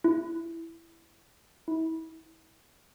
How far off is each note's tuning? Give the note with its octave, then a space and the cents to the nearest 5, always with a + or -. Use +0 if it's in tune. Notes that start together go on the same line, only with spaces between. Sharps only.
E4 +10
E4 -35